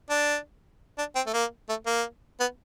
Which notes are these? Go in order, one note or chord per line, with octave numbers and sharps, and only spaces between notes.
D4
D4
C4
A3
A#3
A3
A#3
B3